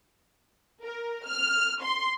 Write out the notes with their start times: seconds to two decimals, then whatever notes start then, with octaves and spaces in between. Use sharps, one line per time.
0.83 A#4
1.26 F6
1.82 C6